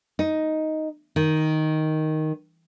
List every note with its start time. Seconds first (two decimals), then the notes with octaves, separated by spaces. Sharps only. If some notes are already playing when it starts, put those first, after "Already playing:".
0.19 D#4
1.16 D#3